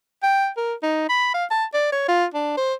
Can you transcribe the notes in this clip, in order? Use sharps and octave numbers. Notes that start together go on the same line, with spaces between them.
G5
A#4
D#4
B5
F5
A5
D5
C#5
F4
D4
C5